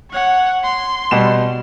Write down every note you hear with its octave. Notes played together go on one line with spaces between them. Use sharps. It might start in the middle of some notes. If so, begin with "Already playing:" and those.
C#5 F#5
C6
B2 G3 E7